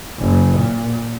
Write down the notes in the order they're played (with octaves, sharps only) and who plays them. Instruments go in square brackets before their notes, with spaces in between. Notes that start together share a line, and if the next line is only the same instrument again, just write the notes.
[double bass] F#1
A#2